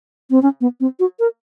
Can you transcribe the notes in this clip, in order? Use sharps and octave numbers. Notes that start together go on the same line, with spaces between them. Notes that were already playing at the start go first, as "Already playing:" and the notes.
C4
C#4
B3
C4
F#4
A#4